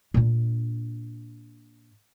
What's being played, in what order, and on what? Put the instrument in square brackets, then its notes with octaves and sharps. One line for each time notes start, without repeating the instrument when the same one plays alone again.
[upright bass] A#2 D4